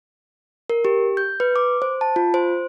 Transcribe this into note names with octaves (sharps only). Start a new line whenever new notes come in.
A#4
G4
G6
B4
D6
C5
A5
F4
C5